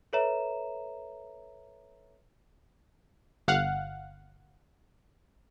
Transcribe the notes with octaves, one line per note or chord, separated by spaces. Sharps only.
A4 B4 C#5 E5 A#5 E7
G1 F5 F#5